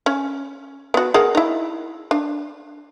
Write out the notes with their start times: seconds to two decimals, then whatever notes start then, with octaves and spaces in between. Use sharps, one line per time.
0.06 C#4
0.94 B3 F#4
1.14 G#4 A#4 F#5
1.35 D#4 E4
2.11 D4